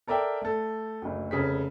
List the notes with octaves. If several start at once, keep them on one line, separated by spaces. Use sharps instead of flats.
A4 A#4 D5 E5 G5
A3 A4
F#1 D2
F1 C#3 G#4 B6